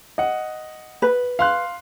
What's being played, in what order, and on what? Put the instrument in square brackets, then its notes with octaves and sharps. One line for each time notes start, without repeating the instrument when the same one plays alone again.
[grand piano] D#5 F#5
[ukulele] B4
[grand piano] F5 C6 F#6